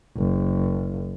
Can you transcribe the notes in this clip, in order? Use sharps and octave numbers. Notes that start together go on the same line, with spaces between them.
F#1